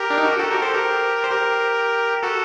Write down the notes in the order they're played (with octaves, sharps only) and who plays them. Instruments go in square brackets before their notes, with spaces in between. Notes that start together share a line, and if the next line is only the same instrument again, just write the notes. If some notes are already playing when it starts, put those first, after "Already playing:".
Already playing: [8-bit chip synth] G4 A#4
D4
D#4
F#4
G4
F#4 A4
G4 A#4
A4 C5
G4 A#4
C5
G4 A#4
F#4 A4